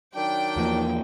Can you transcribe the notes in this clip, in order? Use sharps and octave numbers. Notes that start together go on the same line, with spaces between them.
D#3 F#3 D4 G5
E2 F3 A#3